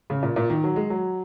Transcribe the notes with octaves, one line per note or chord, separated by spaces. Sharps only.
C#3
A#2
A#2
D#3
F#3
G#3
F#3